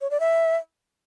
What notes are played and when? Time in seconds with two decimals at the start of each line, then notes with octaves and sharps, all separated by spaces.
0.01 C#5
0.11 D5
0.20 E5